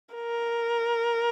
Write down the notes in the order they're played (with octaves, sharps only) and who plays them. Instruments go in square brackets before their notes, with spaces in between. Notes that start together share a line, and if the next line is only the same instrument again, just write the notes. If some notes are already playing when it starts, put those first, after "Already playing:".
[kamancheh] A#4